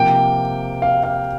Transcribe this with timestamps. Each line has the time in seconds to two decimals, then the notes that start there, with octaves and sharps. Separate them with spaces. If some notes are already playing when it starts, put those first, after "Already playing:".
Already playing: C3 F3 A#3 G5
0.82 F5
1.04 F5